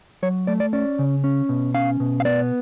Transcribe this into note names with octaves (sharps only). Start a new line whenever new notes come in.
F#3 C#5
A3 D5
D5
C#4 D5
C#3
C#4
B2
C#4 F5
B2
F5
B3 D5